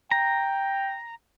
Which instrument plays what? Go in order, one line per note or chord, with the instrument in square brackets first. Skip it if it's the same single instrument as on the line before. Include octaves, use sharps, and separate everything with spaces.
[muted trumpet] G5 [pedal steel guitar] A#5